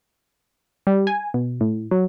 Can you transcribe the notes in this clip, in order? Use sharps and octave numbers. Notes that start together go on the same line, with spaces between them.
G3
G#5
B2
A2
F#3